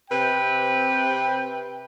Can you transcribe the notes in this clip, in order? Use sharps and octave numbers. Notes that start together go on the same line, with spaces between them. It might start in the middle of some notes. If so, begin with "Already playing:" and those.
C3 B4 G5